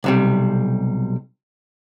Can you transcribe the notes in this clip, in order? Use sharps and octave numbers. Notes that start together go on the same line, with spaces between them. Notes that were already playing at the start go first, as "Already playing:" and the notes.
B1 C3 G3